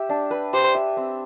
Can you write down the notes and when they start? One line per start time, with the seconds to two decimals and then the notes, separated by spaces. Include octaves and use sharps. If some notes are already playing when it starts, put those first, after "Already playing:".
Already playing: G4 E5
0.09 D4
0.31 B4
0.53 G4 C5
0.75 E5
0.97 C4